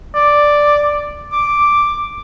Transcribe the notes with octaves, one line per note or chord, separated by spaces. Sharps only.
D5
D6